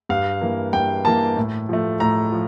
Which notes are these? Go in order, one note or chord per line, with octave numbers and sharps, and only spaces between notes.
G2 F5
E3 A#3
G2 G5
E3 A#3 A5
A2
F3 A3
A2 A#5
F3